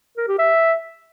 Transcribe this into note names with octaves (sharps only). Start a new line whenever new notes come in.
A#4
G4
E5